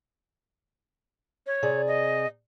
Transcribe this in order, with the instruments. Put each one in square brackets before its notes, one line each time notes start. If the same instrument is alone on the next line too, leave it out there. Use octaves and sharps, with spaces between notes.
[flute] C#5
[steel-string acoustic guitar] C3 G#4 D5
[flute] D#5